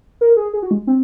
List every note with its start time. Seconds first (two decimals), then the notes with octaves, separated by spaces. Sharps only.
0.21 A#4
0.37 G#4
0.53 G#4
0.63 F#4
0.71 G#3
0.87 C4